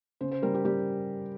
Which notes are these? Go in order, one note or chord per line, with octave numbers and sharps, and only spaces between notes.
C#3 C5
C5
G3 A#4
G4
G3 G4